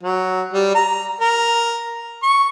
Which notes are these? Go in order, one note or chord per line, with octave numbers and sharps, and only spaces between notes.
F#3
G3
A#5
A#4
C#6